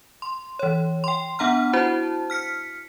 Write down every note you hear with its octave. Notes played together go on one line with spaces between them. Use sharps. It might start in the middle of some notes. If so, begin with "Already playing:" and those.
C6
E3 C#5
G5 C6
B3 D4 F#5 A#5 F6
E4 F#4 C5 A5
F6 B6 C#7